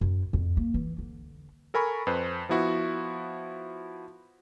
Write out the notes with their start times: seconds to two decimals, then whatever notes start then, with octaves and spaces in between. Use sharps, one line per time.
0.01 F#2
0.33 F2
0.57 A#3
0.74 E3
0.98 D3
1.74 A4 A#4 G#5 B5 C#6
2.07 F2 B4 C5
2.49 F3 B3 E4 F#4